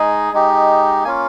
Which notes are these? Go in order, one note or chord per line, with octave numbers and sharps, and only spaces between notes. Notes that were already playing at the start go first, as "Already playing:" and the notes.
Already playing: G#3 D#4 G#4
G#3 D#4 G4
A#3 C#4 F4 G#5